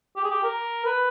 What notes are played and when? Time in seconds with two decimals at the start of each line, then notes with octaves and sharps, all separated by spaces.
0.16 G4
0.24 G#4
0.31 G4
0.44 A#4
0.85 B4